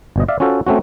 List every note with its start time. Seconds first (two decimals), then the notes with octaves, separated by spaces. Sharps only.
0.16 G1 B2 D#5
0.28 D5 E5 F5
0.40 C#4 F4 F#4 A4 C5
0.67 A3 C4 C#4 F#4